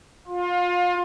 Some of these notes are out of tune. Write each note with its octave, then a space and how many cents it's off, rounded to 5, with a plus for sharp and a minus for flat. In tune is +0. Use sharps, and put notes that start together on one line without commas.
F4 +25